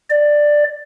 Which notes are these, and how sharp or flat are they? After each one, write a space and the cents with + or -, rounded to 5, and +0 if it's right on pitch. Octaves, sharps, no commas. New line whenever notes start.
D5 +10